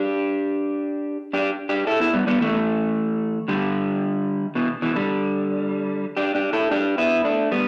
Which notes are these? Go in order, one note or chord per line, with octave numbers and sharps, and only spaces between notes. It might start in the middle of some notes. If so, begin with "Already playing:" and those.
Already playing: D4 G4
D4 G4
D4 G4
E4 A4
B3 E4
G3 B3
G3 B3
E3 A3
D3 G3
B2 E3
B2 E3
D3 G3
D4 G4
D4 G4
E4 A4
D4 G4
B3 E4
A3 D4
G3 B3